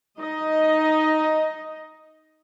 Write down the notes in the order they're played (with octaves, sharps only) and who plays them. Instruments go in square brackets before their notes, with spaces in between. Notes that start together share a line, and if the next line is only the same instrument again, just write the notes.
[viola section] D#4 D#5